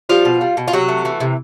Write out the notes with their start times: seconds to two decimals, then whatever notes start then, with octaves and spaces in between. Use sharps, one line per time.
0.09 F3 G3 F4
0.25 B2
0.41 G3
0.57 B2
0.68 F4
0.73 C3 F#3 F#4
0.88 A3
1.05 E3
1.20 C3